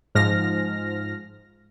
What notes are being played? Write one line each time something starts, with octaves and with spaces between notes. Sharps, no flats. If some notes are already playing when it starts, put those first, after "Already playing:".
G#2 F3 F6 A#6